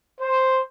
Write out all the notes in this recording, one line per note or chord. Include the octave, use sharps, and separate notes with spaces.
C5